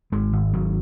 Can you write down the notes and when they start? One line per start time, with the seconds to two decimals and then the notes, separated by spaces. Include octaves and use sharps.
0.12 G#1 G#3
0.33 G#1
0.53 G#1 F#3